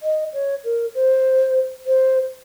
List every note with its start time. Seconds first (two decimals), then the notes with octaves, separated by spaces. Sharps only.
0.03 D#5
0.34 C#5
0.64 A#4
0.95 C5
1.86 C5